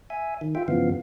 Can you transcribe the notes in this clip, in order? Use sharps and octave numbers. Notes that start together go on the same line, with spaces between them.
E5 G#5
D#3
F4 E5 G5
G2 C#3 E3 F3 B3 F5